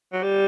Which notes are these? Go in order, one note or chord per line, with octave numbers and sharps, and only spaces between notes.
F#3
G3